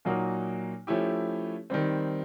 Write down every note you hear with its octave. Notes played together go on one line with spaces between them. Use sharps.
A#2 F#3 A#3 D#4 F#4
F3 A3 C#4 E4 G4
D#3 G3 C4